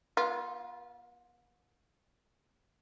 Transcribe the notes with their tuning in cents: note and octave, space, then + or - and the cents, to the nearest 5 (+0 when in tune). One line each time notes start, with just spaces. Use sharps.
B3 -45 F4 +0